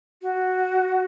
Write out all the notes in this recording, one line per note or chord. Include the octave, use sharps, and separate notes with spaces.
F#4